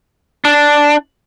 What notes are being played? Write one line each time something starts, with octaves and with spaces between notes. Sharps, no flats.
D4